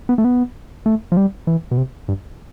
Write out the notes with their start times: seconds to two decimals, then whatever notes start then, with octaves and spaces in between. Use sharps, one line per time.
0.09 B3
0.18 A3
0.24 B3
0.86 A3
1.12 F3
1.17 G3
1.47 E3
1.71 B2
1.78 C3
2.08 G2